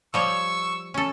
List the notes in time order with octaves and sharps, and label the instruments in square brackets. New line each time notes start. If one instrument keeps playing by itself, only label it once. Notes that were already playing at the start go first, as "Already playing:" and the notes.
[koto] F3 G3 C#5 [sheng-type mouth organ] C#6 E6
[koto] C#4 A4